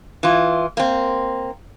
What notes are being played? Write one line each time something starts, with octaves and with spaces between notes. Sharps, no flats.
E3 F4
A#3 C4